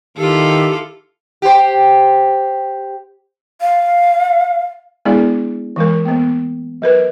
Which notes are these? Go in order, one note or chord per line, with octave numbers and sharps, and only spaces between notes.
D#3 E4 F4 G4 A4
G4 C5
F5
G#3 B3 D4 E4 G#4 D5
E3 G#3 A#4
A#3 B3
F#3 A#4 B4